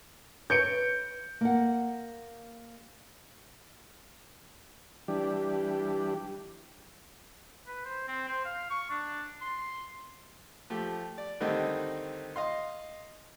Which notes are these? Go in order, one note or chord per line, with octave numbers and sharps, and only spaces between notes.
B4 C#5 G6 C#7 D7
A#3 F#5
E3 G3 D4 G4
B4
C5
C4
C5
F5
C#6
D4
C6
F3 A3 G4
D5
D3 D#3 G3 A3 C4 D#4
D#5 F5 C6